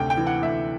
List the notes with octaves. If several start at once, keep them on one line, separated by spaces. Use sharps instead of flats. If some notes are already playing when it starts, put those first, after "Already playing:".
Already playing: D2 C3 G5
G5
E3
F#5
D2 E5